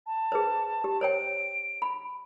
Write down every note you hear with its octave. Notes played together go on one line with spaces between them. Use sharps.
A5
G#4 B4 C5
G4
C5 C#5 G5 D7
B5